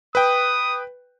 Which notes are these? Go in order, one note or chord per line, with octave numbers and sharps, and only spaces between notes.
B4 G5 D#6